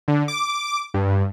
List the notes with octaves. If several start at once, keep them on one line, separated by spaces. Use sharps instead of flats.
D3
D6
G2